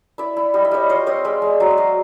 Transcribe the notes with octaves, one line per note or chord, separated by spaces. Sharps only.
E4 D5 E5
E4
G3 D#5
E5
G3 C#5 D#5
F4 C#5 D#5
C4 C#5 D#5
G#3 D5 E5
G#3
F#3 D5 E5
E5
F#3 D#5 F5